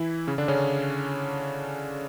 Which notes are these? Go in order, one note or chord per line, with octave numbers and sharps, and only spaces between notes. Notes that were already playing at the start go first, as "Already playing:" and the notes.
Already playing: E3 E4
C#3 C#4
D3 D4
C#3 C#4